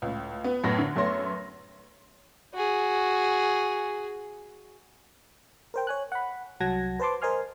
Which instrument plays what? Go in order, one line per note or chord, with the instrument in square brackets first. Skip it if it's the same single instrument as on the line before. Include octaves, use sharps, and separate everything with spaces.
[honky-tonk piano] C#2 A2
B3
F#2 A2 B3 B4 G#6 A#6
D3
F#2 A3 B3 C#5 C6 A#6
[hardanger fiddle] F#4 G#4
[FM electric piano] A#4 C5 G5
C#5 G#5 F#6
F#5 B5
C2 F#3 F#5 A5 G#6 A#6
B4 C5 A5 C6 D6
A#4 C5 D#5 G#5 C6 F6